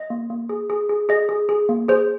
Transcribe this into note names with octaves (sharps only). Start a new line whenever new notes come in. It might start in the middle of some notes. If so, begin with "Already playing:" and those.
Already playing: D#5
A#3
A#3
G#4
G#4
G#4
G#4 D#5
G#4
G#4
A#3
G#4 C5